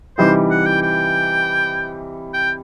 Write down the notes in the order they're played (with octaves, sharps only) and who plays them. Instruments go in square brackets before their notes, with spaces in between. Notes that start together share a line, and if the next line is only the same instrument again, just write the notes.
[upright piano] C3 E3 G3 D#4 [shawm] C5
[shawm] F#5
G5
G5
G5